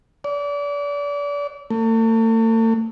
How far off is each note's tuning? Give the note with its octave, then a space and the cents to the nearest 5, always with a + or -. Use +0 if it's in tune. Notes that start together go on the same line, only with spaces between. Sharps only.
D5 -35
A3 +40